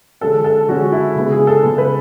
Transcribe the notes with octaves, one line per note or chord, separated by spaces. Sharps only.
D3 G#3 C#4 A4
A4
D3 G#3 C#4 F#4
E4
C#3 G#3 B3
G#4
A4
C#3 G#3 B3
B4